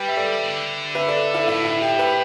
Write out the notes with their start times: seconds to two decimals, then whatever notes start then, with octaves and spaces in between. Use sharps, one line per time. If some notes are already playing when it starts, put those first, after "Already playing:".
Already playing: G3 G4 B4
0.08 E5
0.17 A4 D5
0.43 D3
0.95 B4 E5
1.08 A4 D5
1.34 E4 A4
1.47 A2 E4
1.65 E4
1.82 G4
1.99 G4 B4